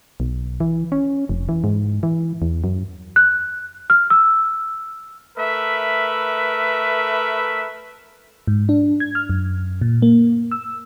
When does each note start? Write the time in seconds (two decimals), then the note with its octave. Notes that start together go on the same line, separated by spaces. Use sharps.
0.20 B1
0.60 E3
0.92 C#4
1.29 F1
1.49 E3
1.64 G#2
2.03 E3
2.42 E2
2.64 F#2
3.16 F#6
3.90 F6
4.10 E6
5.37 A3 A#4 B4 E5
8.47 G#2
8.69 D4
9.00 G#6
9.15 F6
9.30 F#2
9.81 A#2
10.02 A#3
10.51 E6